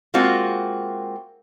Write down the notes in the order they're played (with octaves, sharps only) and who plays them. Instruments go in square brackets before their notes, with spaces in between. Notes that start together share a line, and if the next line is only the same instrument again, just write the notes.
[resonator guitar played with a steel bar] G#3 A#3 C4 F4 F#4